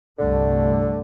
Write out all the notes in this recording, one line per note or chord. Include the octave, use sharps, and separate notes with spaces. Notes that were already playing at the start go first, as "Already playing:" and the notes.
C2 G2 D3 A3